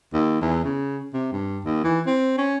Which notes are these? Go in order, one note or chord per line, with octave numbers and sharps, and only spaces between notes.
D#2
E2
C#3
C3
G2
D#2
E3
C4
C#4